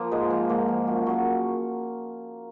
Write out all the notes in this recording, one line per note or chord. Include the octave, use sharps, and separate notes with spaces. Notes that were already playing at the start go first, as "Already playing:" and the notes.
Already playing: F3 A#3
G#2 G#3
F3
G#2 A#3
F3
F#2
C#3 F#3